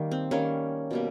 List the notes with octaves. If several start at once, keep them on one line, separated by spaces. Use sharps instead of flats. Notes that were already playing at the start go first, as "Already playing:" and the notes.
Already playing: D#3 G3 A#3
C4
D#3 G3 A#3 C#4
B2 G3 A#3